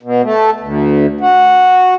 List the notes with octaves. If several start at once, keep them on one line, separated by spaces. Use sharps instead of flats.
B2
A3
D2
F#4